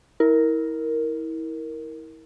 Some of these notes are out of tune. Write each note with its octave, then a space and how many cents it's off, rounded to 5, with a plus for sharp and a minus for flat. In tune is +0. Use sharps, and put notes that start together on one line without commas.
E4 -30 A#4 +0